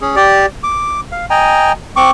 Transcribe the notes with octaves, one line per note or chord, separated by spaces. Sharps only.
C#4 G#4
G4 D5
D6
F5
D#5 G5 G#5 A#5
C4 C#6 D6